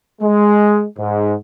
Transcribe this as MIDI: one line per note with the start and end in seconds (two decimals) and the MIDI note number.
0.22 0.85 56
0.98 1.34 44